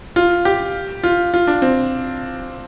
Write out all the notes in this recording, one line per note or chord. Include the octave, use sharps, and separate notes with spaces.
F4
G4
F4
F4
D4
C4